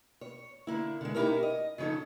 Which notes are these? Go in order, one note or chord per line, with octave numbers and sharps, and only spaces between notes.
C#5
D3 A#3 E4
D3 G#3
C#4 D#4 E4 F#4 G4 A#4
D#5
C#3 F3 C#4 D#4 A4